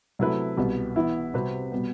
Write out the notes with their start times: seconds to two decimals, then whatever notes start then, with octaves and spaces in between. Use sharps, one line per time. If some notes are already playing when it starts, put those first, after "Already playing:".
0.19 C3 F#3 A3 E4 B4
0.57 C2 B2 G3 B3
0.96 E3 B3 E4
1.34 C3 G3 C4 F#4 B4
1.72 B2 G3 B3